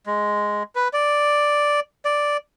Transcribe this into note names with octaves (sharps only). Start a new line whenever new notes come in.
G#3
B4
D5
D5